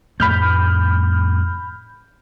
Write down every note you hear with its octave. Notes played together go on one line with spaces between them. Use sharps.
F2 A2 A3 B5 F6 G6